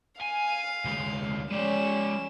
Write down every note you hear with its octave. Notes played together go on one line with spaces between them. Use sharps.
F5 G#5
D2 G#3
G#3 C#4 D5 E7